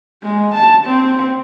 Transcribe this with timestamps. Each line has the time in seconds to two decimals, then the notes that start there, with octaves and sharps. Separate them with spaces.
0.23 G#3
0.55 A5
0.85 C4